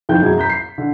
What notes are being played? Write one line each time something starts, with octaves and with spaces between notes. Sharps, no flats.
F2 D#3 G5 G6
F#2 F#3 G#4 G#6
A#5 G6 B6
C7
D3